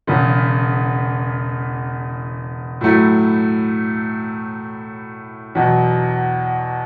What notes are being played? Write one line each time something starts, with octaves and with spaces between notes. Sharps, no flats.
E1 E2 C#3
A2 F#3 A3 E4
E2 B2 F#3